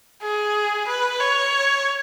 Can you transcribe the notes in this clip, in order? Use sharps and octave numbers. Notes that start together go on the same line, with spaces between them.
G#4
B4
C#5